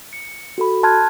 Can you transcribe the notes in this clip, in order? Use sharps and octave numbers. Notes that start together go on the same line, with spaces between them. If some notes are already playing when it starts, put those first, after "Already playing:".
C#7
F#4 A4 B5
A5 C6 F6 F#6 G#6